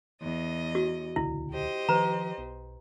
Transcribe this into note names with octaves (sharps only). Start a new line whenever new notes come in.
E2 D#5
F#4
D#1 C#2 D3 E4
G4 C5 D#5
D#3 F3 B4 A#5
B1